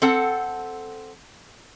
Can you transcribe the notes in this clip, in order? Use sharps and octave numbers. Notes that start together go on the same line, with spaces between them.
C4 A4 F#5